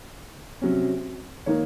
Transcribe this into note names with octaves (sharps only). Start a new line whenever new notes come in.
C3 F#3 C#4
D#3 A#3 D#4 C#5